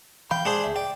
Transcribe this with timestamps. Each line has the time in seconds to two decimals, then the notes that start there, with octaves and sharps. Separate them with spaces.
0.31 E3 F5 G5 B5
0.45 G#3 D4 G#4 C5 A5
0.64 D2 E5
0.76 D5 G5